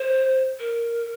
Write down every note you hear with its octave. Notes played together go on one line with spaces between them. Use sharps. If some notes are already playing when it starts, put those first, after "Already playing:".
Already playing: C5
A#4